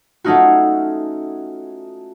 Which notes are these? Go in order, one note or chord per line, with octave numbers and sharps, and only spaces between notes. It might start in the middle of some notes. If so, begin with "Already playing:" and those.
A3 C#4 D#4 F4 F#4